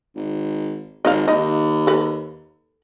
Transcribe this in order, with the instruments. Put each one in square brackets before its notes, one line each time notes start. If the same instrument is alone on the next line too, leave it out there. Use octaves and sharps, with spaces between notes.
[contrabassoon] G#1
[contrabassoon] G#1 [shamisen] D#5 F5
[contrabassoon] D#2 [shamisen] D#4 D#5
[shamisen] A4 B4